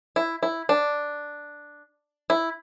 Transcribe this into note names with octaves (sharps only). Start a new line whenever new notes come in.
E4
E4
D4
E4